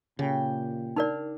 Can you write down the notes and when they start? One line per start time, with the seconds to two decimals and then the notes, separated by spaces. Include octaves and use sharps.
0.19 A#2 C#3 G4 G5
0.96 D4 D#4 A#4 D5 F6